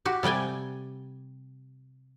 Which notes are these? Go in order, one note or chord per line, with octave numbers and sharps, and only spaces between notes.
F#4 G4
C3 G3 D5 G5 G#5